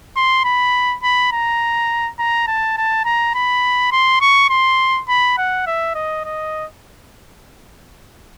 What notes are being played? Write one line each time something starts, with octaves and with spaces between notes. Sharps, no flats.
C6
B5
B5
A#5
A#5
A5
A5
A#5
B5
C6
C#6
C6
B5
F#5
E5
D#5
D#5